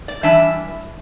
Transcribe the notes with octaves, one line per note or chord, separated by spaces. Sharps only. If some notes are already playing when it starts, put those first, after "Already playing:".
D5
E3 G3 D4 E5